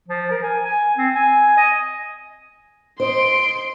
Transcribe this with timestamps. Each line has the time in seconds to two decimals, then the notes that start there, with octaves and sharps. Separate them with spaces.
0.08 F3
0.30 A#4
0.42 G#5
0.64 G#5
0.97 C4
1.15 G#5
1.57 D#5
3.00 C5 D#5 C6 D7